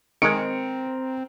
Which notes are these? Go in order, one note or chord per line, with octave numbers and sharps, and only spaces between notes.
D#3 G#3 C4 A#4 C#7 D7